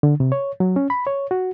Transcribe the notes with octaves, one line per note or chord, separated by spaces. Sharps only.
D3
C3
C#5
F#3
C#4
B5
C#5
F#4